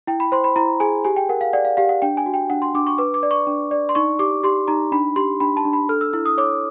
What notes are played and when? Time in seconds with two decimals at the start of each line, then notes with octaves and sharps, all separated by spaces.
0.07 E4 G5
0.20 B5
0.32 C5 C6
0.44 B5
0.56 E4 A#5
0.80 G#4 G#5
1.05 G4 G#5
1.16 G5
1.29 A#4 F#5
1.41 F5
1.53 D5 F#5
1.65 F5
1.77 G4 F5
1.89 F#5
2.02 D4 G5
2.17 G#5
2.26 F#4
2.34 G5
2.50 D4 F#5
2.62 C6
2.74 D4 D6
2.87 C#6
2.98 B4 D6
3.14 D6
3.23 D5
3.31 C#6
3.47 D4
3.71 D5
3.89 C6
3.95 D#4 C#6
4.19 G4 D6
4.43 G4 C6
4.68 D#4 A#5
4.92 D4 B5
5.16 G4 C6
5.40 D4 B5
5.57 A5
5.65 D4
5.73 B5
5.89 A4 F6
6.01 E6
6.13 E4 E6
6.25 D#6
6.38 C#5 D6